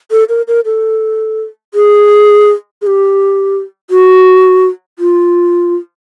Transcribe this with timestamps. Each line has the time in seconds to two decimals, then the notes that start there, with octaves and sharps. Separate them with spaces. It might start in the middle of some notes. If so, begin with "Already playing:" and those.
0.11 A4
0.29 A#4
0.48 A#4
0.65 A4
1.74 G#4
2.82 G#4
2.87 G4
3.90 F#4
4.99 F4